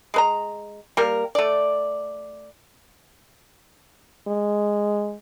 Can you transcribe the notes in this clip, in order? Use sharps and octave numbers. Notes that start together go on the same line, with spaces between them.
G#3 B4 A#5
G3 A#3 A#4
A3 D5
G#3